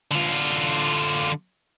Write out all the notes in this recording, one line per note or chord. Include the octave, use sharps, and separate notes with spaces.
D3 F4